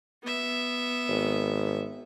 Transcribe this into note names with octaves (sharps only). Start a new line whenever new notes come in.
B3 E5
G#1